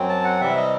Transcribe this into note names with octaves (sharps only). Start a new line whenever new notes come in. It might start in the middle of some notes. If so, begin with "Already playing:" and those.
Already playing: F#2 F#3 C4
A5
F#5
C3 E3 G3 C4 E5
D#5